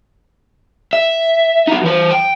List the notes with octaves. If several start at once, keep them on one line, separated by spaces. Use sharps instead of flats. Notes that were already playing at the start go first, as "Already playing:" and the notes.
E5
D#4 F#4
E3 C5
G5